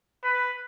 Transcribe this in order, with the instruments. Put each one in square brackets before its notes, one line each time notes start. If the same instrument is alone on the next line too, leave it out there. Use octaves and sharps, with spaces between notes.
[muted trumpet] B4